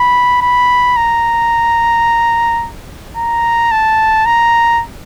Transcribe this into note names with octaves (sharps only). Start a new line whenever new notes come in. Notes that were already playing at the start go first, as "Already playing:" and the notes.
Already playing: B5
B5
A#5
A#5
A5
A#5